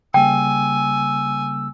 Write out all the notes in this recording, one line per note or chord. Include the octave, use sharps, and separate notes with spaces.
C#3 G3 A#3 G5 G#5 E6